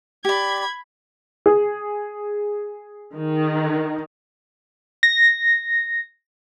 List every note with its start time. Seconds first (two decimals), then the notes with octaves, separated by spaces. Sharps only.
0.25 G4 D5 B5 G#6
1.46 G#4
3.17 D#3
5.03 A#6